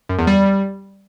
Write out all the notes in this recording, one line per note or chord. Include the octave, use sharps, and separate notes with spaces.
F#2
E2
G3